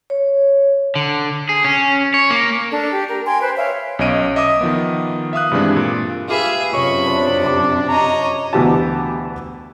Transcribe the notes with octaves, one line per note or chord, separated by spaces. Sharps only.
C#5
D3
G#4
C#4
C#5
A#3
D4 A4
G4
A#4
G5 G#5 C6
B4 C5
C#5 E5 F5
B1 C#4 C#5 D#5 D7 D#7
D#5 E5 D6 D#6
D#3 F3 B3
E5 F5 D#6 F#6
G2 C3 E3 G#3 D4
A#2
F4 G4 G#4 B4 E5 F5
F#2 C3 C#5 D#5 B5 C#6
D4 C5 C#5
D6
C#5 D#5 A#5
D2 B2 E3 B3 G4 A5